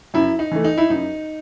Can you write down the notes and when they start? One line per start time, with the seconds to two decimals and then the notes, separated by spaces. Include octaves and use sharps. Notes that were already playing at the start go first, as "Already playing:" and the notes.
0.14 F#2 E4
0.39 D#4
0.51 E3 A3
0.64 D#4
0.78 E4
0.90 F#2 D#4